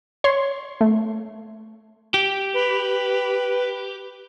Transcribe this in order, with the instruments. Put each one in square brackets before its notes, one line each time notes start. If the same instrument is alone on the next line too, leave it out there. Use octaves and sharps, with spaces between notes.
[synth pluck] C#5 C6
A3
[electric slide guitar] G4
[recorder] B4